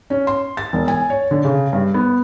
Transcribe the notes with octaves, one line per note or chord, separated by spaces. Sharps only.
C#4
C6
A6
E1
G#5
C#5
D3
C#3
G2
B3